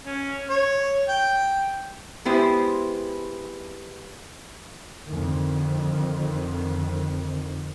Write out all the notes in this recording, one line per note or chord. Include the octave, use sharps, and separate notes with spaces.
C#4
C#5
G5
G#3 B3 E4 G4 C5 D5
F2 D3 D#3